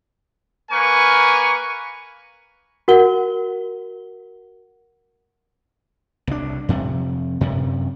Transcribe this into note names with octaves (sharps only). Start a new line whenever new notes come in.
A#3 A#4 B4 G#5 C#6
F#4 A#4 F#5 G7
C2 D4
F2 C3
F#2 C3